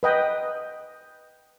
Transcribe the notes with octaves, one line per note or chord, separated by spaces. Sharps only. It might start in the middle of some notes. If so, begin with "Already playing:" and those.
B4 D#5 G5